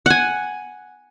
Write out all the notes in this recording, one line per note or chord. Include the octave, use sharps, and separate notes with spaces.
F#5 G#5